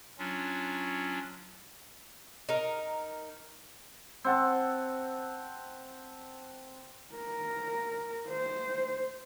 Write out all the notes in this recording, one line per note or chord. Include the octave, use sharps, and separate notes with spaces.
F#3 C#4 D4 F4
D#4 A#4
C4 F#5 A5
A#4
C5